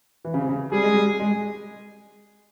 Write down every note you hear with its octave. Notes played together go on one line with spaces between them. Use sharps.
E3
C#3
C3
C#3
G3 G#4
G#3
G3
G#3